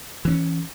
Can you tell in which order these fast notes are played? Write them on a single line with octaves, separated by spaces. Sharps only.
E3 C4 C#4